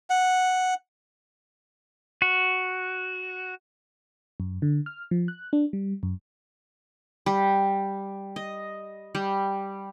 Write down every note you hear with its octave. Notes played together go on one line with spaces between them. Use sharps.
F#5
F#4
F#2
D3
F6
F3
F#6
D4
G3
F#2
G3
D#5
G3